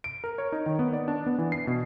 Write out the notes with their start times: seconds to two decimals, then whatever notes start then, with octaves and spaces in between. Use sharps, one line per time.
0.04 D7
0.24 A#4
0.38 C#5
0.52 D#4
0.66 D#3
0.79 B3
0.93 D5
1.08 D4
1.26 B3
1.38 E3
1.52 C7
1.67 B2